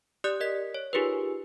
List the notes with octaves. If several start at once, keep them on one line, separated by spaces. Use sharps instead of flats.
G4 D5 D#6 F#6
A#4 D#5 B6
C#5
D#4 F4 G4 G#4 A#4 B4